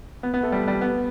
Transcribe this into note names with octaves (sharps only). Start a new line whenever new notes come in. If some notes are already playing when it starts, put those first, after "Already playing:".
B3
B3
A3
G3
G3
B3